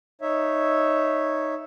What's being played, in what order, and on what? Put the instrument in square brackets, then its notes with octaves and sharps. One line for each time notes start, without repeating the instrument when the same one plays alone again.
[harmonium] D#4 C#5 E5